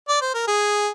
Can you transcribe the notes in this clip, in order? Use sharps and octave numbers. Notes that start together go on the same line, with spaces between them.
D5
C5
A#4
G#4